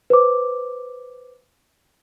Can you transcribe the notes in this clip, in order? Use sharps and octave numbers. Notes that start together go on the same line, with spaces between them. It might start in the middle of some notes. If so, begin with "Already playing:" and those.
B4 C5 D6